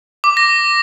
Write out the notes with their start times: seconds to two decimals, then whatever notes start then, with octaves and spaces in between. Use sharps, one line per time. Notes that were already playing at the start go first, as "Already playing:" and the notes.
0.24 D6
0.37 A#6